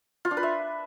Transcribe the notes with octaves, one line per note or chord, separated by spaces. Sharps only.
F4
D4
B4
E5